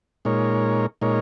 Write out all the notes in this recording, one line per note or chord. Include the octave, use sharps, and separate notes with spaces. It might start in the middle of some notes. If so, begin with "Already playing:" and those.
A#2 G#3 D#4 A#4 C#5
A#2 G#3 D#4 A#4 C#5